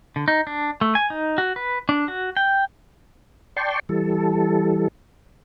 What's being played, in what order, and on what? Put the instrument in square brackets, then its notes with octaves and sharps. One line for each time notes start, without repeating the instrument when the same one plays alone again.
[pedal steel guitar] D3
D#4
D4
A3
G#5
D#4
F#4
B4
D4
F#4
G5
[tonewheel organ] D5 G5 A5 C6 C#6
E3 G3 A4